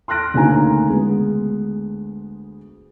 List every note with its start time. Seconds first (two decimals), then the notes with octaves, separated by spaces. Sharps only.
0.08 C6 F6 F#6 A#6 D7
0.34 D2 C#3 A#3 D#4 G#5 A#5
0.88 D2 G#3 B3